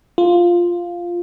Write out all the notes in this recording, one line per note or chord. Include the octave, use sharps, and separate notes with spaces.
F4